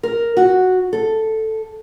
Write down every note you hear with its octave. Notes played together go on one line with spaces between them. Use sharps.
A#4
F#4
A4